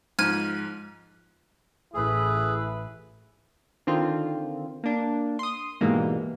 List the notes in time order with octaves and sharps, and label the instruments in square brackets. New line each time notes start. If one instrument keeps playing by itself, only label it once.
[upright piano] G#2 F3 [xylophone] F6 G#6 D#7
[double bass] A1 [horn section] E4 B4 [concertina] G#4
[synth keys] D3 D#3 C4 F4
A#3 D4
C6 D#6
G#2 B2 E3 G3 G#3 A#3